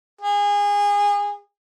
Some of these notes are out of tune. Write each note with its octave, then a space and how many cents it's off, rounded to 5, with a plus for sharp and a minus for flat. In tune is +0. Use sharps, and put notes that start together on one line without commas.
G#4 -25